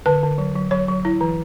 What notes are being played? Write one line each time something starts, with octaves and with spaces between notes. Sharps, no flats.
D3 B4
D3
F#3
F#3
F#3 C#5
F#3
E4
E3